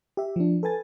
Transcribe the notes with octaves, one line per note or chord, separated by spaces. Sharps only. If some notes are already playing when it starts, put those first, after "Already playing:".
G4 E5
F3 D4
A4 B4 G#5 A6